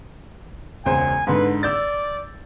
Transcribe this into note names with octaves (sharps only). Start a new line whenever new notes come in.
E1 C#2 C5 G#5
G#2 D3 B4
D5 E6 G6 A6